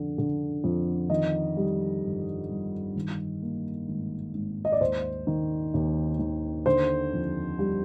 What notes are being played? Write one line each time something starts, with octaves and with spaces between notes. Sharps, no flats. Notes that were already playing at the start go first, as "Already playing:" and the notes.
Already playing: F2 D3
D3
F2
D#3 D#5
G3
G1
G2
D#3
A#3
G#1
G#1
D#5
D5
D#2 C5
D#3
D#2
D#3
D3 C5
F2
G3